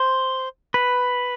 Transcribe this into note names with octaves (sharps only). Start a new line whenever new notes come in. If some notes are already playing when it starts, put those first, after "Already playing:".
Already playing: C5
B4